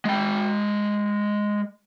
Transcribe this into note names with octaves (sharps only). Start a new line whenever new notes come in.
G#3 G5